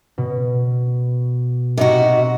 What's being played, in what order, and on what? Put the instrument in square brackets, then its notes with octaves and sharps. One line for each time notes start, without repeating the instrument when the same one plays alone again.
[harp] B2
[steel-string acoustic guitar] C3 D#4 F#4